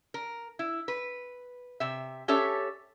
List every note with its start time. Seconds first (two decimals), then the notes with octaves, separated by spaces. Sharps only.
0.14 A#4
0.59 E4
0.88 B4
1.80 C3 E5
2.28 C#4 G4 A4 C#5 E5